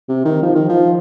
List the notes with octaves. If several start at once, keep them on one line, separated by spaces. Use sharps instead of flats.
C3
D#3
F3
D#3
F3